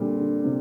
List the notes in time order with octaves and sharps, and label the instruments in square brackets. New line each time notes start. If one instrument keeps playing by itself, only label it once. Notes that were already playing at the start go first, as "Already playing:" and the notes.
Already playing: [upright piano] A#2 D3 [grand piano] G3 C4
[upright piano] D3
C3